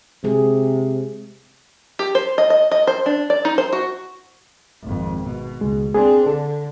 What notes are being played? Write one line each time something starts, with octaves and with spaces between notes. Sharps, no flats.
C3 G#3 G#4
G4
C5
D#5
D#5
D#5
C5
D4
D5
D#4
C5
F#4
G#1 F2
B2
C#2 G#3
C4 D4 G#4
D3 A4